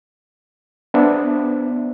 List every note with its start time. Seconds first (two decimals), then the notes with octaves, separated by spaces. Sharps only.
0.94 B3 D4 C5 E5